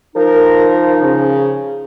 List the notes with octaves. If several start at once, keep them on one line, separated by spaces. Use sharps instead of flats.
F3 D#4 A#4
C#3